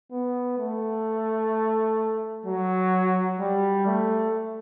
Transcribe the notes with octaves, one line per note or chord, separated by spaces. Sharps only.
B3
A3
F#3
G3
A3